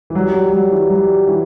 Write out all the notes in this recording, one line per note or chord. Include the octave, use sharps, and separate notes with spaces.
E3
F#3 G3
F#3
F#3
E3
F#3
E3